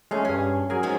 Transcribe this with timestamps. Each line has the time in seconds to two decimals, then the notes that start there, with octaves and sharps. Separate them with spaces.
0.11 G#3 A3 C#4 F5
0.25 G2 C#4 G#4
0.70 F#3 G#4 A#4 G#5
0.83 G#2 F3 G#3